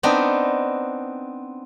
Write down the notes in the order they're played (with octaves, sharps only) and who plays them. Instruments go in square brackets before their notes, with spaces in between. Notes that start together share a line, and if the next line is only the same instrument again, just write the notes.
[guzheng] B3 C4 D4 D#4